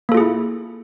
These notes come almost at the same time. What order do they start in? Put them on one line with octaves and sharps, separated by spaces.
A#3 A4 F4 G#4 E4